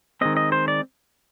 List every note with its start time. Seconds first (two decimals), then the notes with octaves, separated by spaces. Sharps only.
0.21 D#3 G#3 C4 D#5
0.37 D#5
0.52 C5
0.68 D5